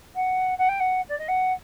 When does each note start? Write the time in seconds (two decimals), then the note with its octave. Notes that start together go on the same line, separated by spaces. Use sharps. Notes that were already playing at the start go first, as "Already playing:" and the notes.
0.15 F#5
0.58 F#5
0.68 G5
0.80 F#5
1.08 D5
1.18 D#5
1.28 F#5